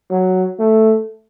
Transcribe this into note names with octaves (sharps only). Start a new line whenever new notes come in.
F#3
A3